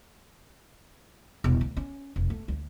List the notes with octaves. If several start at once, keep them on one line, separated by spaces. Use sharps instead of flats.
E1 C2
D2
C#4
F1
A3
D2